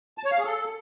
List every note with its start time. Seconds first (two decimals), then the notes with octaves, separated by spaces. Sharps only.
0.18 A5
0.25 C#5
0.31 F5
0.38 G#4
0.45 A4